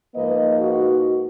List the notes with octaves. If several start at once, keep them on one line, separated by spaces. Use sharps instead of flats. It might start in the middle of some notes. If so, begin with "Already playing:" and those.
G#2 F3 A#3 B4 D#5
D#4 F#4